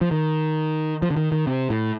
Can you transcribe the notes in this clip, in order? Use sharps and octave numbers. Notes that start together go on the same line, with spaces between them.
F3
D#3
F3
D3
D#3
D#3
C3
A2